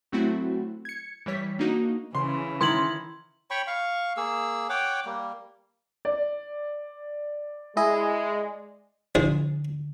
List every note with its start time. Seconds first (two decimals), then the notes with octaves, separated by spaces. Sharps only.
0.12 F#3 A3 C4 E4 F#4
0.85 G#6 C#7
1.26 E3 G3 C#5 B6
1.59 A#3 D4 D#4 F#4
2.15 C#3 E3 C6
2.61 D#3 E4 C6 G#6 F#7
3.51 C#5 G5 B5 C#6
3.67 F5 C#6
4.17 A#3 G#4 E6
4.69 C#5 F#5 G5 D6
5.05 G3 A#3
6.05 D5
7.77 G#3 E4 G#4 D#5
9.15 A#1 D3 E3 G#4